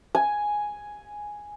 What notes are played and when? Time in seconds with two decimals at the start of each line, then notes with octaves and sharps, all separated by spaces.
0.15 G#5